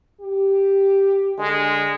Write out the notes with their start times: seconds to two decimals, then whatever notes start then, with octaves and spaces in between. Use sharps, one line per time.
0.21 G4
1.38 D3 G#3